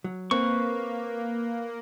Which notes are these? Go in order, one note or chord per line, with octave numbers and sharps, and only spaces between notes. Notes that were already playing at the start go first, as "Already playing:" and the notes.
F#3
A#3 C4 B4 C#6